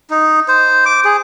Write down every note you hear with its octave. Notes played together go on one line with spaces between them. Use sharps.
D#4
C5
D6
G#4